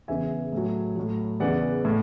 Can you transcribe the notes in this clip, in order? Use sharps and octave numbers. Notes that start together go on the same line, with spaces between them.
E2 C#3 E3 E5 G#5
A2 F#3
A2 F#3
E2 C#3 E3 D5 F#5
A2